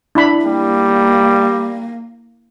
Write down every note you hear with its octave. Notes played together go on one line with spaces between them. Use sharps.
D4 E4 B5
G3 A#3